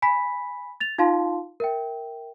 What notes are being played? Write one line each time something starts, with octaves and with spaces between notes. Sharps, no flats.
G#5 B5 B6
A6 F7
D#4 F4 F5 A5 C6
A#4 E5 G5